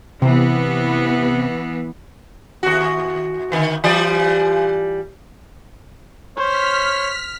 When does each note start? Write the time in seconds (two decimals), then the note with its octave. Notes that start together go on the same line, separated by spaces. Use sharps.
0.22 C3 E3 B3
2.63 D#2 F#4
3.52 D3 D#3
3.84 E3 G3 D5
6.37 C5 C#5 F6 B6